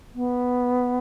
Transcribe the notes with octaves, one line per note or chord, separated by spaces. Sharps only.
B3